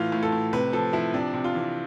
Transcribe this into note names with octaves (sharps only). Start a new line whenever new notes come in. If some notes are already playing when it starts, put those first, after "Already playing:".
Already playing: A2 E3 F4
A2
A4
A2
C3 B4
F3 A4
F3 E4
C3 D4
C3
F4
E3